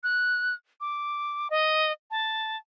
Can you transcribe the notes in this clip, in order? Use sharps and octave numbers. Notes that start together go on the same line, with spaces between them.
F#6
D6
D#5
A5